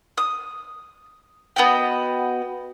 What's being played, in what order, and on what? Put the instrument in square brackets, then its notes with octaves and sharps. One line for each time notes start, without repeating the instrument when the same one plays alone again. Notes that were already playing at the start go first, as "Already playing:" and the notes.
[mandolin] D#6
B3 F#4 D#5 G5